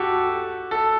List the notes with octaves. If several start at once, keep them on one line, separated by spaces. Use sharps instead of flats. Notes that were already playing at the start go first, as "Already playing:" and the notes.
Already playing: F#4 G4 A4
A4